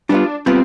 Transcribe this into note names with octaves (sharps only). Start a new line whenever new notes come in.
G3 B3 D4 F4
G3 B3 C4 F4